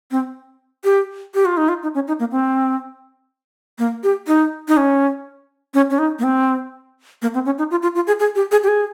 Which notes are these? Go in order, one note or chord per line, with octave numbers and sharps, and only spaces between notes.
C4
G4
G4
F4
D#4
F4
D#4
C#4
D#4
A#3
C4
A#3
G4
D#4
D#4
C#4
C#4
C#4
D#4
A#3
C4
A#3
C4
C#4
D#4
F4
F4
F4
G#4
G#4
G4
G#4
G4
G#4